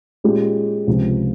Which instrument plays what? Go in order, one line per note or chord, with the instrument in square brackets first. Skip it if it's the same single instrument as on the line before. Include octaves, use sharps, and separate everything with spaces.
[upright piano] A#2 G#3 C#4 G4
C#2 C3 F3